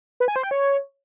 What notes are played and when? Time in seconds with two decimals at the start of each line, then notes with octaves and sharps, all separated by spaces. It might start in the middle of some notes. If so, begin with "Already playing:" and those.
0.20 B4
0.28 G#5
0.36 C5
0.43 G5
0.51 C#5